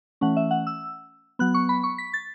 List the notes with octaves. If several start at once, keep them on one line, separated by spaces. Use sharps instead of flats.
E3 A3 C#4 F#5
E5
F#5
E6
F#3 B3 F#6
C#6
B5
C#6
B6
A6